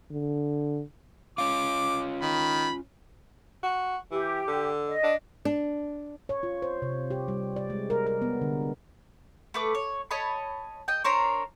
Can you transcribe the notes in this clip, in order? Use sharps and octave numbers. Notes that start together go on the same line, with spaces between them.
D3
C#4 F4 D6
D#3 B5
F#4
E3 G4
D3
D#5
D4
D4
C#5
F4
C5
C3
G4
G3
D5
G#3
A#4
A#4
B3
D3
A3 B4 D6
C#5
C#5 D#5 A5 B5
D#5 G5
D4 A#4 C5 C#5